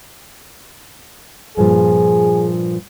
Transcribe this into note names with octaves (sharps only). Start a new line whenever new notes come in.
G2 A#2 F3 G#4